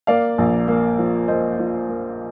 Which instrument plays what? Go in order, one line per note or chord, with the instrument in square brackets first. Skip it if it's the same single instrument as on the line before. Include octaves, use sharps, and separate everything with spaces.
[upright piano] A#3 D5 F5
A#1
A#3
F3
A#3 C5 D#5
F3
A#3